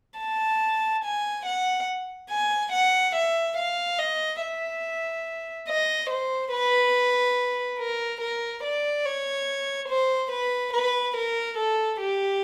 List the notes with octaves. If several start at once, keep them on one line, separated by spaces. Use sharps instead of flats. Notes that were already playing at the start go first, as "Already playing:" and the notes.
A5
G#5
F#5
G#5
F#5
E5
F5
D#5
E5
D#5
C5
B4
A#4
A#4
D5
C#5
C5
B4
B4
A#4
A4
G4